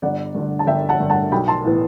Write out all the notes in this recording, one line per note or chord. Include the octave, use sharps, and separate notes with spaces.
G1 D5 F#5
G2 D3
A5
G1 E5 G5
F#5 A5
G2 D3
F#5 A5
B1 G5 B5
A5 C6
A2 E3 B3